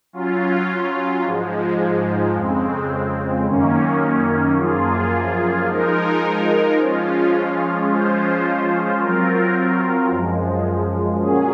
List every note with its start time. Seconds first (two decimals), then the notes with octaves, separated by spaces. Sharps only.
0.13 F#3 C#4 F4
1.24 G#2 F3 G#3
2.34 F2 C#3 G#3 C4
3.45 F#2 D#3 A#3 C#4
4.56 F#2 F3 A#3 F4 G#4
5.67 F3 G#3 D#4 A#4
6.77 F3 G#3 C#4 F4
7.88 F3 G#3 C#4 F4 C5
8.99 F#3 C4 F4 A#4
10.10 F#2 F3 G#3
11.20 A#2 F#3 C#4 G#4